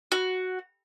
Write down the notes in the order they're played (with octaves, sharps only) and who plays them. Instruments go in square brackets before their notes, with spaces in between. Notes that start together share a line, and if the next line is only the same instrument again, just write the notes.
[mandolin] F#4